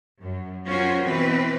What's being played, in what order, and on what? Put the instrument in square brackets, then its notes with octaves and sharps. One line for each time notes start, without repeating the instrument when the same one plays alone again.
[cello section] F#2
F#3 C#4 F4 F#4 A#4 C5
B2 E3 C4 B4